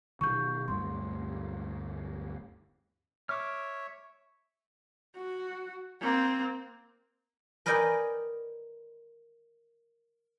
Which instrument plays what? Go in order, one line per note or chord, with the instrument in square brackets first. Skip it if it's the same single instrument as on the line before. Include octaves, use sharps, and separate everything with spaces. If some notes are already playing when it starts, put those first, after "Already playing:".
[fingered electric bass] B2 D#3 [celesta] C#6 G6
[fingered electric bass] D1 G2 A3 [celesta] C6
[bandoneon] C#5 E5 [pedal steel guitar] D6 F6
[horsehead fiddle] F#4
A#3 C4
[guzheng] A#4 B4 D5 D#5 G5 G#5